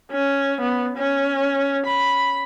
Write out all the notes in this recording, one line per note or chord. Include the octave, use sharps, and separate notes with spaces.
C#4
B3
C#4
B5